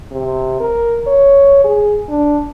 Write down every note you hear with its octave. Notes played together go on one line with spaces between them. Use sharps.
C3
A#4
C#5
G#4
D4